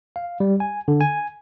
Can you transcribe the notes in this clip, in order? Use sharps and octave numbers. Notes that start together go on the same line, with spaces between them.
F5
G3
G#5
D3
G#5